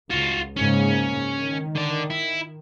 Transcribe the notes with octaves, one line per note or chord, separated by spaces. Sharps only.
C#2 F4 F#4
G#2 C#3 A#3 C#4
D#3
D3 D5
E4